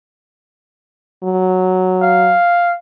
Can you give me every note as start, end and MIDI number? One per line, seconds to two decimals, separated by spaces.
1.23 2.34 54
2.02 2.76 77